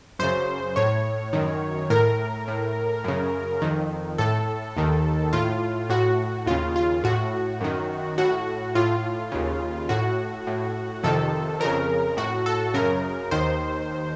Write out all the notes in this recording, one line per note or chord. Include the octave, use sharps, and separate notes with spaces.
F#2 C#3 C5
A2 C#5
F#2 D#3
A2 A#4
A2
F#2 C#3
F2 D#3
A2 A4
D#2 D#3
A2 F4
A2 F#4
D#2 C#3 F4
F4
A2 F#4
F#2 D#3
A2 F#4
A2 F4
D#2 C#3
A2 F#4
A2
F2 C3 D#3 A4
F2 C#3 A#4
A2 F#4
A4
F#2 C#3 A#4
D#2 D#3 C5